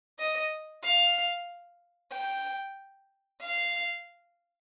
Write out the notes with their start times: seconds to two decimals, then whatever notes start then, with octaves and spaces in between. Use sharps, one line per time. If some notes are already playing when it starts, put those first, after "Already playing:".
0.19 D#5
0.84 F5
2.12 G5
3.41 F5